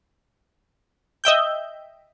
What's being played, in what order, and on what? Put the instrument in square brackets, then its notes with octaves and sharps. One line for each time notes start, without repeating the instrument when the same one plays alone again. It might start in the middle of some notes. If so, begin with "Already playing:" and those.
[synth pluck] D#5 E5 G5 G6